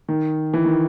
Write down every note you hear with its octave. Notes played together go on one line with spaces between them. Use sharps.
D#3
E3
D#3